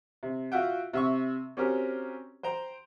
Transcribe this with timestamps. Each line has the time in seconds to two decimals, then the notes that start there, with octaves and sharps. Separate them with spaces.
0.23 C3
0.52 F4 F#4 E5 F#5 G5
0.93 C3 E5 C#6
1.57 C4 C#4 F#4 G4 A#4
2.43 C5 G5 A#5